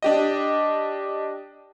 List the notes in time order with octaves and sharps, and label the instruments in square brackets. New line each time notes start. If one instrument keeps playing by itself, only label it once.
[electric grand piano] D4 G4 D#5